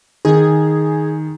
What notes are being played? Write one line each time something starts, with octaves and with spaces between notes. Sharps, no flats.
D#3 G#4